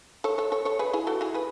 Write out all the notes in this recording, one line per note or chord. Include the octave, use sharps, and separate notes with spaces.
A4 C#5
A4 C#5
A4 C#5
A4 C#5
G#4 B4
E4 G#4
F#4 A4
E4 G#4
G#4 B4